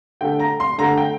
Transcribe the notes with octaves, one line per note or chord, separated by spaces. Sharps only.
D3 A3 G5
A#5
C6
D3 A3 A#5
G5